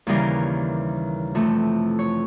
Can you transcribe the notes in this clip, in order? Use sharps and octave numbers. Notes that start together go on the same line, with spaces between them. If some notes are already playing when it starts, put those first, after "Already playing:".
D#2 C#3 E3 G3 A#4
F2 C3 E3 A3
C#5